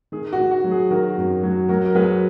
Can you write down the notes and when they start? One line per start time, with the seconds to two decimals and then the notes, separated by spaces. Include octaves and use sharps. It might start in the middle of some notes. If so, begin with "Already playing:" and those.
0.12 D#3 G#4
0.33 F#4
0.38 D#3
0.51 F#4
0.64 F#3
0.71 G#4
0.91 D#3 F#4 A#4
1.18 F#2
1.43 F#3
1.69 F#3 F#4 A#4
1.84 A#4
1.95 F#3 G#4 B4